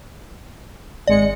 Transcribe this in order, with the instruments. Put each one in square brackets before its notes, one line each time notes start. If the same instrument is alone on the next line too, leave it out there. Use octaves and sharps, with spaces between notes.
[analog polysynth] G#1 G#3 C#7 [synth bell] D5